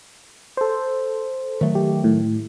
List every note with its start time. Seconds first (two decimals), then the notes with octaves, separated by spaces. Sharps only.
0.57 A4 C5
1.61 D#3 F#3 A3
1.75 G4
2.04 A2